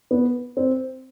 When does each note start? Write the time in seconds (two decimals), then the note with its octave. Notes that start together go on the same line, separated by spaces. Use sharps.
0.11 B3
0.57 C4